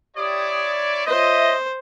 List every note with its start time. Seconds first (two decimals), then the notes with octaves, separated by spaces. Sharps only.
0.16 E4 G4 C#5 D5 D#6
1.07 F4 C5 C#5 D#5 E5